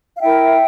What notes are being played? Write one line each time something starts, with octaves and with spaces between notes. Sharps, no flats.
F5
E4 A#4 E5 G5